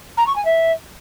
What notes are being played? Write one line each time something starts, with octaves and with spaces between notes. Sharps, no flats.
A#5
C#6
G#5
E5